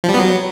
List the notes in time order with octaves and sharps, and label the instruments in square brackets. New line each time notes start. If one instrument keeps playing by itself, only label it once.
[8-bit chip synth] F3
G3
B3
F#3